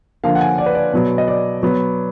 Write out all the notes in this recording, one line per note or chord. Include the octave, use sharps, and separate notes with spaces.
D3 F3 A#3 F5
F#5
G#5
D5
B4
D5
B2 F#3 B3
D#5
D5
B2 F#3 B3